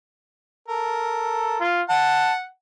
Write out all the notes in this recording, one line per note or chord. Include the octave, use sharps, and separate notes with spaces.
A4 A#4
F4
F#5 A5